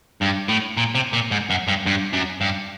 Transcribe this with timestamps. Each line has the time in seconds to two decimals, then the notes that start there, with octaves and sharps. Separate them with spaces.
0.22 G2
0.49 A2
0.77 A#2
0.95 C3
1.13 A#2
1.31 G#2
1.50 F#2
1.68 G2
1.86 G2
2.13 F#2
2.41 G2